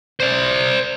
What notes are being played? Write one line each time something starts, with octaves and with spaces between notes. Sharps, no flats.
C5 D5